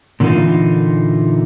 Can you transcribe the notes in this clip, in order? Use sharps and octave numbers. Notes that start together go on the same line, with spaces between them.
A#2 D3 E3 G#3 D#4 F4